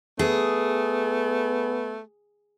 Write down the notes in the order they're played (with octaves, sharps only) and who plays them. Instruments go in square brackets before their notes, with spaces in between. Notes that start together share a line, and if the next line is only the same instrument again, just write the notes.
[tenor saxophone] A3 [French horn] B3 [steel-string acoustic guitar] G#4